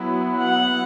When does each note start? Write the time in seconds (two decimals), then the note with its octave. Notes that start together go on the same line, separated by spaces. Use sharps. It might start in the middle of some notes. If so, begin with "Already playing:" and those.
Already playing: F#3 B3 E4
0.40 F#5